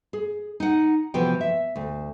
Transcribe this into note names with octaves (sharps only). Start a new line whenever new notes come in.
G#4
D#4 F#5
C3 E3 F3 B3 F#4 G5
E5
D2